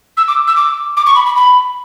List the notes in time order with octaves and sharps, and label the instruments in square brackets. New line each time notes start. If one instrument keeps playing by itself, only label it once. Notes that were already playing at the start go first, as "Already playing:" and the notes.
[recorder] E6
D6
E6
D6
D6
C#6
B5
B5
B5